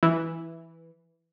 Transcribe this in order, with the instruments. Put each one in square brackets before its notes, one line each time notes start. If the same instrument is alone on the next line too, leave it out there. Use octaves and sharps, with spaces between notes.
[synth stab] E3